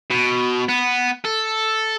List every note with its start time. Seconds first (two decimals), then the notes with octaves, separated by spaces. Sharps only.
0.11 B2
0.69 B3
1.25 A4